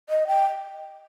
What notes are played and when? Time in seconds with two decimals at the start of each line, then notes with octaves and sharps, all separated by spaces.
0.09 D#5
0.27 G5